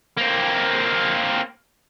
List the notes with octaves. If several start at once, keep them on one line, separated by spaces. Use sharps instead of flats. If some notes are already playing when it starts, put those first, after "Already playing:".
A#3 C4